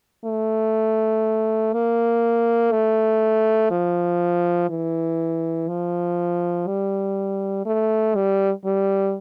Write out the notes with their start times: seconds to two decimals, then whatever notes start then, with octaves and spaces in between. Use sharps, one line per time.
0.25 A3
1.73 A#3
2.72 A3
3.71 F3
4.69 E3
5.68 F3
6.67 G3
7.66 A3
8.15 G3
8.65 G3